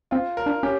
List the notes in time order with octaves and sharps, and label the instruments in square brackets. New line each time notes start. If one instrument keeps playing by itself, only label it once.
[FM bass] C4 [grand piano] F4
[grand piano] A#4
[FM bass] D4
[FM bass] C#4 [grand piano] G4